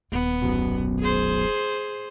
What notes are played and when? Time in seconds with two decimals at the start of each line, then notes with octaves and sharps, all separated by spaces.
0.12 D#1 B3
0.42 B1 F#2 B2
1.00 G#4 C5